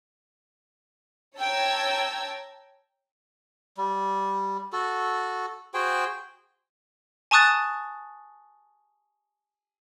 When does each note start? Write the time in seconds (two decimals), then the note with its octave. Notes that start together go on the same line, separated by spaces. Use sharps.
1.38 C#5 G5 A5 A#5 E6 G#6
3.77 G3
4.73 F#4 A4
5.74 F#4 G#4 C5 G5
7.31 G#5 A5 C#6 D#6 F#6 A6